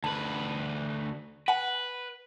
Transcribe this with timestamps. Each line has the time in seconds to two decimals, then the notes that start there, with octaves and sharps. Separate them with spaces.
0.04 D2 B4 A5
1.48 B4 F#5 G#5